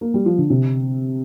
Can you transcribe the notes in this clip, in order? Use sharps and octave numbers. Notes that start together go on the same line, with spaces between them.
A#3
G3
F3
D3
C3